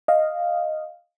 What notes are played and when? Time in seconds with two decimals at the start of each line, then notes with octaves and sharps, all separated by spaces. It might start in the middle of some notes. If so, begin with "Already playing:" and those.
0.08 D#5 F5